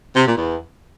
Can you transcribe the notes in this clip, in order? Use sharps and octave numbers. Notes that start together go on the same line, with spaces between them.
C3
A#2
E2